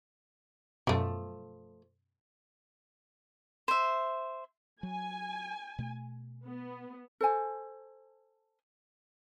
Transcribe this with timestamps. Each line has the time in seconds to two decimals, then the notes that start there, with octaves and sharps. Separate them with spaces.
0.87 F#2 B2 F3 A3
3.68 C5 E5
4.83 F#3 G#5
5.79 B2 A3
6.47 B3
7.21 A4 C5 G#5